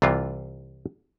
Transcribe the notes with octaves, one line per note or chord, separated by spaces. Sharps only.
C2 C3 E3 F4